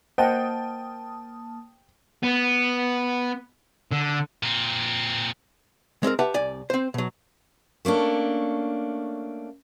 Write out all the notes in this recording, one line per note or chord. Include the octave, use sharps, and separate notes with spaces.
A#3 C5 D#5 F#5 G5 A5 D#6
B3
D3
A#2 C4
G#3 C4 D4 A#4
G4 B4 E5 F#5 A5
C2 D5 G#5
C4 C5
B2 F#3
A3 A#3 C#4 D4